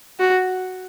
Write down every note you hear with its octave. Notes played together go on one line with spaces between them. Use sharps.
F#4